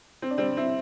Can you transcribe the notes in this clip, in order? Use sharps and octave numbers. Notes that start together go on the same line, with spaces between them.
C4
D4
G3 C4
C4 E4